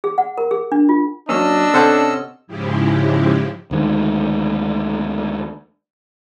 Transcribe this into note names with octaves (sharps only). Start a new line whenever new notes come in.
G#4
F#5
A#4
G#4
D4
F4
F#3 A#3 C#4 D4 D#5 E6
C3 C#4 A4 C5 F#5
G#2 C#3 F3 G#3 E4 G4
D2 D#3 G#3